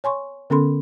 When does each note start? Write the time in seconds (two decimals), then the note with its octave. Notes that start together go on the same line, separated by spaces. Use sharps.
0.04 C#5 G#5 C6 C#6
0.50 D3 B3 C#4 A4 B5 C6